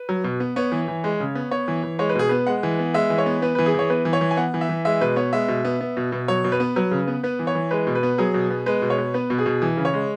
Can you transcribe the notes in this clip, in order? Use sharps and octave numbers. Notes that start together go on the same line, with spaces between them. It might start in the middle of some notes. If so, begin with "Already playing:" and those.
Already playing: B4
F#3
B2
B3
B3 C#5
E3
E3
G#3
C#3
B3
B3 C#5
E3
E3
G#3 C#5
B4
B2 G#4
B3 B4
G#3 F#5
E3
B3
G#3 E5
E3
C#5
B3
B3 B4
E3 B4
G#4
E3 C#5
B3 B4
E3
C#5
E3
G#5
B3 F#5
E3
E5
E3
G#3 E5
B2 B4
B3 C#5
G#3 E5
B2
B3
B3
B2
B2
F#3 C#5
B2
B4
B3
F#3 B4
C#3
B3
B3 B4
E3
C#5
E3
G#3 B4
B2
B4
B3
F#3 G#4
B2
B3
G#3 B4
B2
C#5
B3
B3 B4
B2
G#4
B2
E3
C#3
C#5
G#3